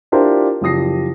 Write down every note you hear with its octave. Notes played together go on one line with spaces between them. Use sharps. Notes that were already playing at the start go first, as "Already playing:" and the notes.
D4 E4 F4 G4 A#4 C5
F#1 F3 G4 D#6 A#6 C7